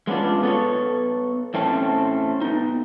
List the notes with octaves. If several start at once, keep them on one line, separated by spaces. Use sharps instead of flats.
G#3 B3 C#4 D4 F4
B3 A4 C#5
A2 A3 C4 C#4 A5
B3 D#4